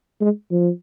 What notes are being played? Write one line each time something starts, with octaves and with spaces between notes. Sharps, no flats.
G#3
F3